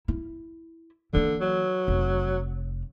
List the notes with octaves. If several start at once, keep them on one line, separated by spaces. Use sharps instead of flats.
E4
D3 E3 A#3
F#3
F1